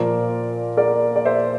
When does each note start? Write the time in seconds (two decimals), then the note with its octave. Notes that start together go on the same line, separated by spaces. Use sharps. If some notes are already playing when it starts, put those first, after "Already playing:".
Already playing: A#2 F3 A#4 D5
0.77 A#4 D5
1.16 D5
1.25 C5 E5